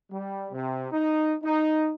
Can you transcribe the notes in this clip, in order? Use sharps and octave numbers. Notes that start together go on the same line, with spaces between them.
G3
C3
D#4
D#4